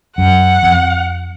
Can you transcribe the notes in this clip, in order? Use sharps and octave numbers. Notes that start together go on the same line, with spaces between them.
F#2 F#5
F2